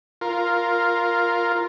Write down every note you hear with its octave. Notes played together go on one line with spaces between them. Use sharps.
F4 A#4